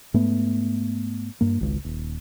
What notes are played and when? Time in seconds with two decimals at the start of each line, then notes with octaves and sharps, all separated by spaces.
0.14 G#2 A3 B3
1.41 G2 A#3
1.60 G#1 C#2
1.84 D#1